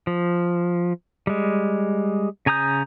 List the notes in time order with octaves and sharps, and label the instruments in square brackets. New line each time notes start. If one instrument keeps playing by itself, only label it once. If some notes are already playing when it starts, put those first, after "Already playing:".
[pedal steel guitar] F3
G3 G#3
C#3 G#5 A#5 D#6 G6